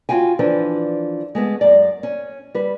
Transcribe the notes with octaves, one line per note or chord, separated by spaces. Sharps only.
F4 F#4 F5 G5 G#5
E3 F3 D4 A4 B4 D5
G#3 A3 B3
F#2 D5
C#4
G3 B4